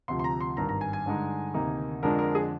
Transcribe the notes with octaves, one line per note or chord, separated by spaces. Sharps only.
D2 C3 F3 C6
C6
A#5
C6
G#1 G2 D#3 A#5
A#5
G#5
G#5
G2 D3 G#3 D#4
D2 C3 D#3 A#3 D#4
F2 D3 F3 G#3 D4 A#4
A#4
G#4